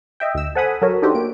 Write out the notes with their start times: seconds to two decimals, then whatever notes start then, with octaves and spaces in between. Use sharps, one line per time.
0.20 D#5 E5 G5
0.34 D2 E6
0.55 A4 C5 F#5 G#5 B5 D#6
0.82 F#3 A4 A#4 C#5
1.02 D4 D#4 F#4 G4 A4 C5
1.15 A#3 D7